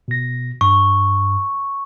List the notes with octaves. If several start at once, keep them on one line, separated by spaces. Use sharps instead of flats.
B2 A#6
G2 C#6